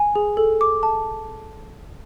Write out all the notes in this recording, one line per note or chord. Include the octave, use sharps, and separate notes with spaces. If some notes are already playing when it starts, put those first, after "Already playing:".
Already playing: G#5
G#4
A4
D6
A5